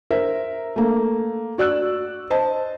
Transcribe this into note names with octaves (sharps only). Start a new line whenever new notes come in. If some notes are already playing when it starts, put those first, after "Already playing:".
A#4 C5 E5
A3 A#3
F#4 D5 E6 F#6
C5 D#5 A5